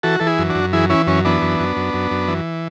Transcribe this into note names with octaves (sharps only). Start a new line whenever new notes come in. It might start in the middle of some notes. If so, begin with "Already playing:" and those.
E3 F#4 A4
E3 A4
E4 G#4
F#2
D4 F#4
F#2
E3 E4 G#4
E3 C#4 E4
F#2 C#4
E3 B3 D4
F#2
F#2
F#2
F#2
F#2
E3